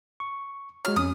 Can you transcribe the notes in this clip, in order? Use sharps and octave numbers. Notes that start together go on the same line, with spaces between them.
C#6
G#3 F#4 C#5 F6
F2 C#4 D#6